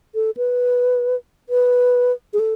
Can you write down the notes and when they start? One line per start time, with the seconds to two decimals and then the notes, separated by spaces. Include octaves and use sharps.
0.15 A4
0.37 B4
1.49 B4
2.33 G#4
2.39 A4